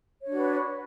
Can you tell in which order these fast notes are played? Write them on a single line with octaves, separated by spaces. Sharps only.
C#5 D4 F#4 B4